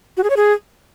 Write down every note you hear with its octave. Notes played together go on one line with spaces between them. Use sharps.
F#4
G#4
C#5
G#4